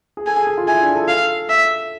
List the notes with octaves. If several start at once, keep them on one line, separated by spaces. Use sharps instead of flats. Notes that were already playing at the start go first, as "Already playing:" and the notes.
G#4
A4 G#5
G#4
G#4
F4
E4 G#5
D4
A4
G#4
A4 F5
E5